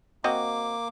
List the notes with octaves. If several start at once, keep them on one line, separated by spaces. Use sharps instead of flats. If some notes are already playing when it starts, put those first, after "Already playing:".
A#3 C4 F#4 D#5 D6